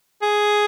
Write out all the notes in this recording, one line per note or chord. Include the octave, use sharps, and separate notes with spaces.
G#4